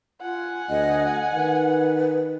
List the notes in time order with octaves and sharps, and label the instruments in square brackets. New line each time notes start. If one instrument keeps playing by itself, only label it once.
[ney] F4 [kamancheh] F#5 G#5
[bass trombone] D2 [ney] D#5
[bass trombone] D#3 [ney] B4